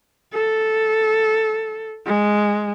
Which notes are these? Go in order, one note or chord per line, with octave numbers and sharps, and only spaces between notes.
A4
G#3